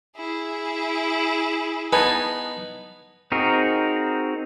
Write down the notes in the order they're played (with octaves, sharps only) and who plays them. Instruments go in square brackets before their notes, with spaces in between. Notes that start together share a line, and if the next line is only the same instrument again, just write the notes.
[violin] E4 G#4
[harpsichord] B3 D#4 [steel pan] B4 G#5 A5
[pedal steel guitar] C4 D#4 F#4 G#4 A#4